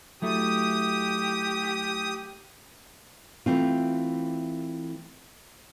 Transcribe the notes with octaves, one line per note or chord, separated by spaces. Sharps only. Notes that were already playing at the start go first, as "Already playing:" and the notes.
F#3 A3 E4 G4 D#6
E3 A3 C4 F4